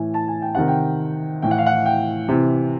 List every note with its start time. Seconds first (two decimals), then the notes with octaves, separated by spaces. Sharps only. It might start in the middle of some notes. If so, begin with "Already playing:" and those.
Already playing: A2 E3 G#5
0.14 A5
0.28 G#5
0.42 G5
0.55 C3 D#3 F#5
0.68 G5
1.42 A2 E3 G5
1.51 F#5
1.58 F5
1.66 F#5
1.86 G5
2.28 C3 E3